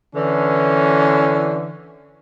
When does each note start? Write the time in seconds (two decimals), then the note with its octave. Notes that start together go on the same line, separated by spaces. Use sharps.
0.15 D3 E3 C#4